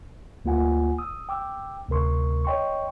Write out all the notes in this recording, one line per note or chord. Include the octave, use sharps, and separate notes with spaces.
D2 A#3 F4 F#5 G#5
D#6 E6
G5 D6 E6
D2 C3 A#4 C6 C#6
C#5 D#5 G5 C6 C#6